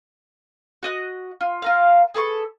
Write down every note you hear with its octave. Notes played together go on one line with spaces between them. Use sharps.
F#4 D#5 F#6
F4
F4 A#4 F5
G#4 A4 B4 C#6